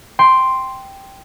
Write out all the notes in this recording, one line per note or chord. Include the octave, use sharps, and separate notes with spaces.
G5 C6